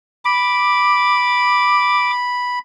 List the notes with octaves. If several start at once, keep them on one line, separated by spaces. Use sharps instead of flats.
B5 D6